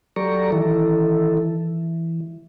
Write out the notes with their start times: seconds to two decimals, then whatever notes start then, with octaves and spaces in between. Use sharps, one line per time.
0.16 F#3 G4 A4 D5 A#5 C#6
0.52 D#3 E3 E4 A4
1.37 E3